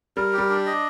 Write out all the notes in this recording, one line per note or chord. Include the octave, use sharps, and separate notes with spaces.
G3 A#4
G4
G3
D4
D#5